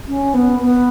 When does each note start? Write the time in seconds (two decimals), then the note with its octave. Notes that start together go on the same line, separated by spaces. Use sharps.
0.08 C#4
0.34 B3
0.60 B3